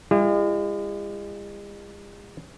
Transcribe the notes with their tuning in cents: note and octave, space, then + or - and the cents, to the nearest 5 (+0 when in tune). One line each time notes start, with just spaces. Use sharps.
G#3 -45 E4 +45